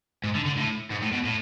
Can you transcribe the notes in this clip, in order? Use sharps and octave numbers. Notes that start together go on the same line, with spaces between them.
G#2
D3
D3
A2
G#2
A2
B2
A2